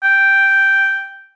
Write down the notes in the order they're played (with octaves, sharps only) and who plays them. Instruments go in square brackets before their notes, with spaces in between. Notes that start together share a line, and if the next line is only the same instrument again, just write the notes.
[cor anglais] G5